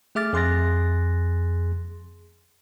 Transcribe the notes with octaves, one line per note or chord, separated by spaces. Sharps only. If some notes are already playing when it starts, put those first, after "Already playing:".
A3 G#4 E5 D6 F6 A6
F2 G#4 C6 F#6 A6 A#6